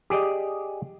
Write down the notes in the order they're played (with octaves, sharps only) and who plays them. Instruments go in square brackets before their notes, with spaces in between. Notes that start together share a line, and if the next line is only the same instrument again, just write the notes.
[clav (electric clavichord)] G4 G#4 D5 D#5